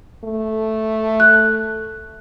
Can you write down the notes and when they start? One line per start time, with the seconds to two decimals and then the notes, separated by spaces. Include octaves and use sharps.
0.24 A3
1.20 F#6